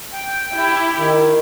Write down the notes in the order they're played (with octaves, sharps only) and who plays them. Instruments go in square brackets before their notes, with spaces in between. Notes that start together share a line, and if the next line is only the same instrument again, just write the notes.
[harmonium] G5
[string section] E4 G4
[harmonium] D#3